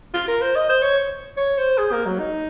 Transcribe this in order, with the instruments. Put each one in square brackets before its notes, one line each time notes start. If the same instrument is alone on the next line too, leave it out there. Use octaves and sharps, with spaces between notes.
[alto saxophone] F4
A#4
C5
D#5
C5
C#5
C#5
C5
G#4
A#3
F#3
D#4